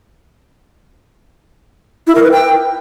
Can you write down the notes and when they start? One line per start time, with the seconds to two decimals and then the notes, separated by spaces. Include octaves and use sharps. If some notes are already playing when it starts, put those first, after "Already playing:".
2.07 E4
2.15 A#4
2.23 B4
2.32 G5